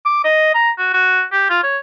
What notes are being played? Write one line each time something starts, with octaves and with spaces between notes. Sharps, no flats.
D6
D#5
A#5
F#4
F#4
G4
F4
C#5